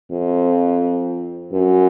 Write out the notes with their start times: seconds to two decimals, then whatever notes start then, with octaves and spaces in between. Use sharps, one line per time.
0.11 F2
1.52 F#2